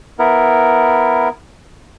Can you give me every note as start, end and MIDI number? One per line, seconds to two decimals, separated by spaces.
0.19 1.29 59
0.19 1.29 64
0.19 1.29 70